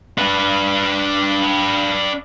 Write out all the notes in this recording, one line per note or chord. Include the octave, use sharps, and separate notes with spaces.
D4 B4